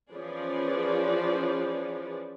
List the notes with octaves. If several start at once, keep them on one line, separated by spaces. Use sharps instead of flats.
E3 F3 C#4 G#4 B4 D5